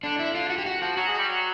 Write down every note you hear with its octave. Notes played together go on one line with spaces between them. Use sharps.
D3 D4
E4
F4
F#4
G4
F#4
F3 F#4
F#3 F#4
G#3
G3
F#3